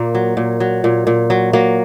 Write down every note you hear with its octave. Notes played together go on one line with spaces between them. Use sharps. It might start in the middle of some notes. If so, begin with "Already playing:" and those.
Already playing: A#2 A#3
F#3
A#2
F#3
A#2
A#2
F#3
F#3 A#3